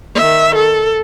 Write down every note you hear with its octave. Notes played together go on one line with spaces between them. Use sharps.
D#3 E5
A4